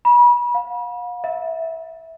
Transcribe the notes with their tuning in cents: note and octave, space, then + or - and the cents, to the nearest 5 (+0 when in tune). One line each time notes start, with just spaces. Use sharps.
B5 -35
F5 +40
E5 -15